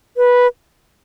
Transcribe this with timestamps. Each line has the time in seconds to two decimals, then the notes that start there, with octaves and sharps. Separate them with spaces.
0.17 B4